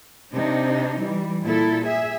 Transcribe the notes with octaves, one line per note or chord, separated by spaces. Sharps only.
C3 D4 D#4
E3 G3
A#2 E4 A4
G#4 E5